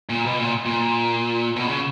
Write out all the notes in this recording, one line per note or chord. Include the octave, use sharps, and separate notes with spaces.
A#2
B2
A#2
A#2
B2
C#3